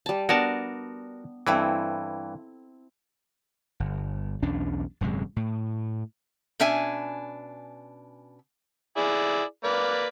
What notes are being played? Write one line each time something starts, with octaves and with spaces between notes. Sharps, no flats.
G3 A5
B3 D4 F#4 A#4 A5
G2 E3 C4 E4 A4
G1
B1 E2 C#4 D4
D#1 F#2 C3 G#3
A2
B2 C#4 D4 E5 G#5
E4 G#4 D5
A#3 B4 D5